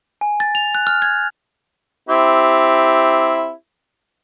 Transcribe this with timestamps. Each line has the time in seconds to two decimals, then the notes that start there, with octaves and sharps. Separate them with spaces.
0.21 G#5
0.40 A6
0.55 F7
0.75 F#6
0.87 F6
1.02 G#6
2.09 C4 E4 G4